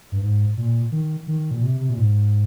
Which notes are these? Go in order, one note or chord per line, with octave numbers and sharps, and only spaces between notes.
G2
G#2
A#2
D#3
D#3
A#2
C3
C3
A#2
G#2